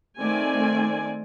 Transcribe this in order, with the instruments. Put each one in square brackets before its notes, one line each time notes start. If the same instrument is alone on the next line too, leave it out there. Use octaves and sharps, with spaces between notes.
[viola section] D#3 A3 C4 D5 G#5